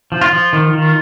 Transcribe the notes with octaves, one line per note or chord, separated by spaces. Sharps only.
F3
F4
F3
D#3
D#3